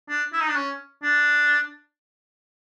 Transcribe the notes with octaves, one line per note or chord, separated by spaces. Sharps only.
D4
E4
D#4
D4
C#4
D4